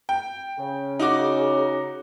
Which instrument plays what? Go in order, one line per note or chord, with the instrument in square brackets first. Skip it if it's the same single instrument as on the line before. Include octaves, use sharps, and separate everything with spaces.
[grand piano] G5
[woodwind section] C#3
[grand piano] D#4 F#4 D6